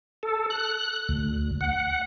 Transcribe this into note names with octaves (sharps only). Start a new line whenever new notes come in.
A4
F#6
D2
F#5